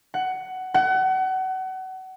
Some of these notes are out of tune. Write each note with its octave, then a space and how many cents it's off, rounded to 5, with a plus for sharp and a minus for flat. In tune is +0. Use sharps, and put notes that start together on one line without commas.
F#5 +15
F#5 +30